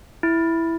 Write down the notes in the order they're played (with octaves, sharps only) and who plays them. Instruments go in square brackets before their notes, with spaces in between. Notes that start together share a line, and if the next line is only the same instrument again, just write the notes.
[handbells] E4